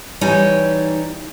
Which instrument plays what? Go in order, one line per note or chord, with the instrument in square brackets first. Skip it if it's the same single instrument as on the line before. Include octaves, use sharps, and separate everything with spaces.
[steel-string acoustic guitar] E3 G3 D#4 C#5 G#5